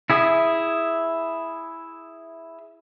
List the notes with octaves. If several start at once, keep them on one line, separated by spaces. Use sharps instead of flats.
E4 G#4 E5 D#6